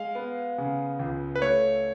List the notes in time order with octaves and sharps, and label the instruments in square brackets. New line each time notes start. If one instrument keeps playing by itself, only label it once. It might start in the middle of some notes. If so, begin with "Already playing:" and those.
Already playing: [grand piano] G#3 [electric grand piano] F5
[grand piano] B3
C#3
C#2
[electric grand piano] B4
[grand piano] A3 [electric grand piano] C#5